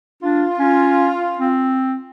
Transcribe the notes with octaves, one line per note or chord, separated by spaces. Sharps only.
D4 F4
C#4
C4